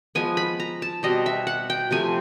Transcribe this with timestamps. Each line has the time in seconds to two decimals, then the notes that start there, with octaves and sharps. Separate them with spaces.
0.15 F3 G#3 B3 G#5
0.37 B5
0.60 A#5
0.82 A5
1.03 B2 G3 C4 D#5
1.26 E5
1.47 F#5
1.70 G5
1.91 C3 F3 A3 G#5